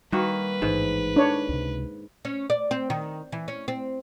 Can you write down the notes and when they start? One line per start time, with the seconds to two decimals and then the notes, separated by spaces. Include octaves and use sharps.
0.12 D#3 G3 A#3 F#4 B4
0.62 A1 G#2 E3
1.16 D4 C#5
1.49 C#2 C3
2.25 C#4
2.50 D5
2.71 C4
2.90 D#3
3.32 E3
3.48 C#4
3.68 C4